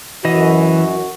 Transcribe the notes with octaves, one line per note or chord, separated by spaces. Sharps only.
F#2 E3 F#4 D#5